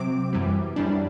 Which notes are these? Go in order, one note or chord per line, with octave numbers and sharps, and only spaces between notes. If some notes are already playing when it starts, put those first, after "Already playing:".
Already playing: C3 F#3 C4 D6
F#2 E3 G3
F#2 E3 G3 D4